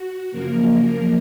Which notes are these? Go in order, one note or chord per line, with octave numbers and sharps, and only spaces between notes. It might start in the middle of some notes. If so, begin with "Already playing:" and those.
Already playing: F#4
F#2 C#3 F3 A#3 A#4